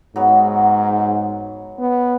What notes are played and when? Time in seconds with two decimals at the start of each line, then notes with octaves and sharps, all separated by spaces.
0.16 G#2 F#3 B3
1.78 B3